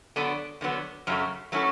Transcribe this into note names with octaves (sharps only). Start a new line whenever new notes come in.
D3 F#3 B3 D4 A4
E2 D3 F#3 B3
F#2 C#3 F#3 A3
F#3 A3 C#4 E4 A4